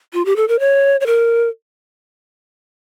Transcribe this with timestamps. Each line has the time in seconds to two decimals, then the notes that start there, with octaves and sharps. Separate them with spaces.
0.13 F4
0.25 G4
0.36 A4
0.48 A#4
0.59 C#5
1.01 C#5
1.06 A#4